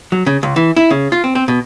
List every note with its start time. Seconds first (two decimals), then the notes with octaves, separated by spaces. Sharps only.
0.12 F#3
0.26 C#3
0.43 C#2
0.56 E3
0.76 E4
0.90 C#3
1.12 F4
1.24 C4
1.35 C4
1.48 B2